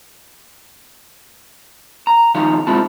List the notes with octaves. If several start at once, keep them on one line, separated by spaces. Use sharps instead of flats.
A#5
D#2 F3 D#4 F5
C2 G#3 C4 E4 F4 A5